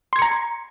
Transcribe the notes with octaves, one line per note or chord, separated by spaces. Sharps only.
A#5 C6 G#6 C#7